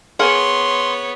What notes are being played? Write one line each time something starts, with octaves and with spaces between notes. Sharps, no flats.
B3 G#4 A#4 C#5 F#5 C6